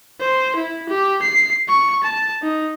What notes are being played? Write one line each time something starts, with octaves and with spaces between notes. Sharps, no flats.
C5
E4
G4
C7
C#6
A5
D#4